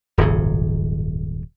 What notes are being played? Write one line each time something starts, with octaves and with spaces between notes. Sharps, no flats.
D#1 G#1 F#2 C#3